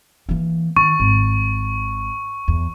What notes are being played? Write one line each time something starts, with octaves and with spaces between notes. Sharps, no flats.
E3 A#3
D#3 C#6
G#1
E2